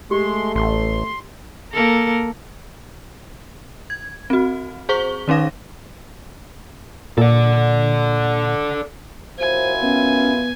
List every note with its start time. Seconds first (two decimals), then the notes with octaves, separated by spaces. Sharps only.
0.11 G#3 A3 G4 C6
0.56 A1 C6
1.73 A#3 A4 A#4
3.90 G#6
4.30 C4 F#4
4.89 G#4 C5 C#6 G7
5.28 D#3 C#4 D#4 F5 A#6
7.18 A#2 A4 D5
9.39 F#2 E4 F4 C5 G#5
9.82 B3 C#4